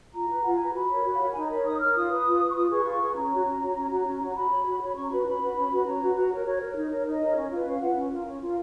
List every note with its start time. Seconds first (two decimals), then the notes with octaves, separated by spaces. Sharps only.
0.14 F4 A#5
0.29 B4
0.42 F4 F#5
0.53 G#5
0.60 B4 A#5
0.74 F#4 B5
0.90 A#4 C#5
1.05 F#4
1.14 F5
1.19 A#4 C#5 F#5
1.31 D#4 G#5
1.41 A#5
1.49 A#4 C#5 B5
1.65 D#4 D#6
1.80 A#4 C#5 F6
1.95 F4 D#6
2.10 B4
2.25 F4
2.40 B4
2.50 C#6
2.54 F4 D#6
2.70 G#4 B4 C#6
2.84 F4
3.00 G#4 B4
3.16 C#4 A#5
3.31 F#4 C#5
3.45 C#4
3.61 F#4 C#5
3.75 C#4
3.91 F#4 C#5
4.06 C#4
4.21 F#4 C#5
4.35 F#4 B5
4.50 C#5
4.65 F#4
4.80 C#5
4.90 B5
4.95 C#4 C#6
5.03 A#5
5.11 F#4 B4 B5
5.26 C#4 B5
5.41 F#4 B4
5.56 C#4
5.70 F#4 B4
5.85 C#4 A#5
6.00 F#4 B4
6.15 F#4
6.31 A#4 C#5
6.46 F#4 C#5
6.60 A#4 C#5
6.76 D#4
6.91 A#4 C#5
7.06 D#4 D#5
7.21 A#4 C#5
7.36 C#4
7.51 F4 B4
7.66 C#4 F5
7.81 F4 B4 F#5
7.95 C#4
8.11 F4 A#4
8.26 C#4
8.40 F4 A#4